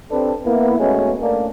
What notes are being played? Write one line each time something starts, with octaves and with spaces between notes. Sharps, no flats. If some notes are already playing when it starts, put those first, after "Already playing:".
C3 C4 D4 A4 B4 C5
A#3 B3 E4
B2 G#3 A3 B3 C#4
A2 A#3 D4